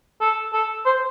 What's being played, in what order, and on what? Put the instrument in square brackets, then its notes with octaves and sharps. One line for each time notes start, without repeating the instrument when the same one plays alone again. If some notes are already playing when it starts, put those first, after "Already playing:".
[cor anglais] A4
A4
C5